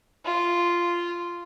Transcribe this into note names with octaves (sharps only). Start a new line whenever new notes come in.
F4